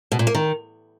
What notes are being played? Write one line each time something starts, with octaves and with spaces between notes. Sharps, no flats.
B2
A#2
A#3
D#3